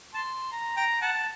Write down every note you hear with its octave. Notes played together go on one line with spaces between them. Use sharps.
A5 C6
A#5
G5 A#5
F#5 A5